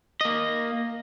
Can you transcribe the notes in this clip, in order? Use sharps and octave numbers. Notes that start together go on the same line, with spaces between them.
A#3 D#5